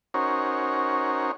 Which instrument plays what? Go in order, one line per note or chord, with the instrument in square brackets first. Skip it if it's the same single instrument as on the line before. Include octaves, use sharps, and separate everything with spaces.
[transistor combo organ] C#4 D#4 F#4 A#4 C5 C#5